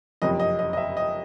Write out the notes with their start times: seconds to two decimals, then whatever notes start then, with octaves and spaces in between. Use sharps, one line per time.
0.22 F#1 F2 C3 D#5
0.40 D#5
0.59 D#5
0.73 D#5
0.77 E5
0.97 D#5